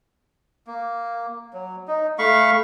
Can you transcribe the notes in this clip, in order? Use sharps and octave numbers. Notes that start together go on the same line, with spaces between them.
A#3
F#3
D#4
A3 F5 B5 C#6